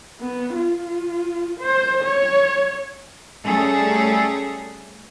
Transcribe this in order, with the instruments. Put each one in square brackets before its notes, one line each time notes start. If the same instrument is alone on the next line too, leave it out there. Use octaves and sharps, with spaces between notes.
[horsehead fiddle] B3
F4
C5
C#5
[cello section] G3 A3 C#4 G#4 A4